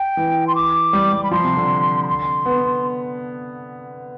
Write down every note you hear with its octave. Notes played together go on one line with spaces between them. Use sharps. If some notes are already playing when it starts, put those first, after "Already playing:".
Already playing: G5
E3
C6
D6
G3
G3
B5
F3 C6
C3
D3
B5
C6
B3